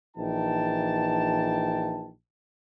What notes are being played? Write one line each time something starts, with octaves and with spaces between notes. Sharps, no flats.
A#1 E3 D#4 G5 A5